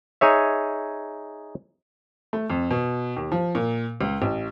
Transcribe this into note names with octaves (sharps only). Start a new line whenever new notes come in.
D#4 G#4 C#5 E5
A3
F2
B2
D#2
F3
A#2
C#2
A1